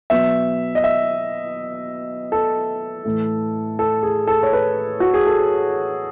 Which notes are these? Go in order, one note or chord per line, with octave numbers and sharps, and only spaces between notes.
B2 F#3 B3 E5
D#5
E5
A4
A2 E3 A3
A4
G#4
A4
C#5
B4
F#4
G#4
A4